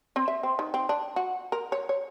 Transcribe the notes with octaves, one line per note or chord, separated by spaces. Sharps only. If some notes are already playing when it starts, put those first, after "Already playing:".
C4
E5
C4
D#3
C4
D4
F#4
A#4
C#5
C#5